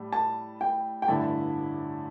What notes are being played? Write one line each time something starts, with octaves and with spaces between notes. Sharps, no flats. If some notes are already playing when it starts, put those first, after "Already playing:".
Already playing: A2 G3
A5
G5
G5
A1 G2 D3 A3 E4 A5